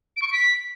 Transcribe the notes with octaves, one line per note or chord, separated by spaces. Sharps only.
D7
C#6
D7
B6